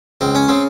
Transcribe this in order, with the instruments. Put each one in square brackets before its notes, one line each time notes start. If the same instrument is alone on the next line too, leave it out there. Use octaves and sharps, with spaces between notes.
[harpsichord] C#2 C4
C#4
C#3 C4